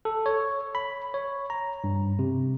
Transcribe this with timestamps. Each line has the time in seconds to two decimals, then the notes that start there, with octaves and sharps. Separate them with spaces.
0.05 A4
0.26 C#5
0.75 B5
1.14 C#5
1.50 A#5
1.84 G2
2.19 C3